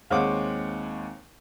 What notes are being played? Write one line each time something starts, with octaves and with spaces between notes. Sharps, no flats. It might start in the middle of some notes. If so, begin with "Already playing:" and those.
D#2 G#3 C4 C#5 F#5 D6